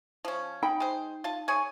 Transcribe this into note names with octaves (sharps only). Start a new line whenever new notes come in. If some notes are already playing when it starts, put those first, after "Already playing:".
F3 C#4
D#4 G5 B5
G#3 C5
F4 A5
G#4 C#5 G#5